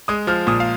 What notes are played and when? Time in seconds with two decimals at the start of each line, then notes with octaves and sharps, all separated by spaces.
0.08 G#3 D#6
0.27 F3 F6
0.47 A#2 D#6
0.60 F5